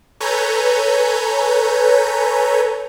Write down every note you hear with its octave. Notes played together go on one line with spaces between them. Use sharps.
A4 B4 C#5 G#5 A#5 G6